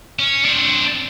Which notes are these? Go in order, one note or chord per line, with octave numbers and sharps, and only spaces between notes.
C#4
C4 D4